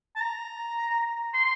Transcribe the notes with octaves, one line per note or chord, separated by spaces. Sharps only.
A5
A#5
C6